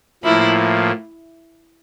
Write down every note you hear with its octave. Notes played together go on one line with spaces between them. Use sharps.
A2 F3 A#3 E4